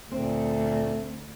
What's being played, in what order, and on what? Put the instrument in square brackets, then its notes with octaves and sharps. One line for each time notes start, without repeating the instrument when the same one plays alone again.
[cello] D2 [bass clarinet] A#2 [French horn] A3 [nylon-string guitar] C4